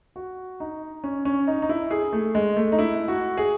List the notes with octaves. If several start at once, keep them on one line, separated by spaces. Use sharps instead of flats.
F#4
D#4
C#4
C#4
D#4
D#4
E4
G#4
A3
G#3
A3
D#4
E4
F#4
G#4